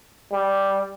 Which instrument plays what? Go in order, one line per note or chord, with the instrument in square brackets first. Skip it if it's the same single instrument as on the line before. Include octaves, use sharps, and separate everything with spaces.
[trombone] G3